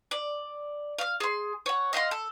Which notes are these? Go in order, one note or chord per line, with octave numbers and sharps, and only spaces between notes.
D5
F5 F6
G#4 C6
C#5 F#5
D#5 F5 F#5 C6
A4